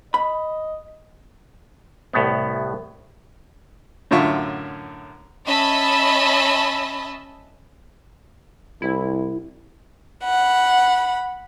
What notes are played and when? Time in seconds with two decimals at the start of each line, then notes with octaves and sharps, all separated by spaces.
0.14 D#5 B5
2.13 C2 A2 B3
4.11 F#2 A2 D3 F4 E5 C#6
5.45 C#4 D#5 E5 A5 B5
8.82 C2 E4
10.25 F#5 B5